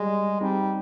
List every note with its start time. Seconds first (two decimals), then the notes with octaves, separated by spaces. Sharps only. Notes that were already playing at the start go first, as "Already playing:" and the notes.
Already playing: G3 G#3
0.41 G3 C4 D#4